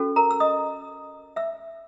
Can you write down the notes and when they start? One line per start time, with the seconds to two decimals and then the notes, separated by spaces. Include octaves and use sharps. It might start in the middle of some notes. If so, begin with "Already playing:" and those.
Already playing: C#4 F#4 A4
0.16 A#4 A#5
0.31 E6
0.40 D#5 D#6
1.36 E5 E6